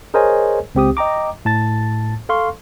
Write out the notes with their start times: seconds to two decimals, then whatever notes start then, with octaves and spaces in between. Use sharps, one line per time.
0.14 G#4 A#4 C5 C#5 D#5 G#5
0.75 C#2 C4 G4 D#6
0.97 D#5 G5 A#5 D6
1.45 A2 A5 A6
2.29 A4 F5 C6 C#6